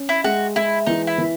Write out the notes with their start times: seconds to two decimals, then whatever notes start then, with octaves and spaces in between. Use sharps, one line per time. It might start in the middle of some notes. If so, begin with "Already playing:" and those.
Already playing: C#4
0.09 E4
0.24 G#3 F#4
0.56 G#3 E4
0.86 E3 D#4
1.07 E4
1.18 E3